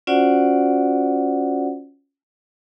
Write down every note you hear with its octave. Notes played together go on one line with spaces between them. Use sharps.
C#4 F4 F#4 C5 D5 F#5